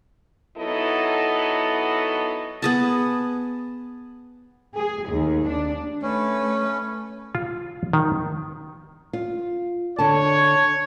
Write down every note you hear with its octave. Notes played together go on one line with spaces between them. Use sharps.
F#3 B3 D#4 E4 A4 D#5
B3 G#4 A5
G#4
D#2
D4
A3 C#4 B4
F4
D#3
F4
D3 C#5 A5